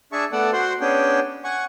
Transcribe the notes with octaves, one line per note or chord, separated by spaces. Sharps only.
D4 G#4 E5 A5 C#6
A3 B3 A4 D5 F#5
F#4 C5 F#5 C6
B3 C#4 D4 G#4 G5
F#5 G#5 C#6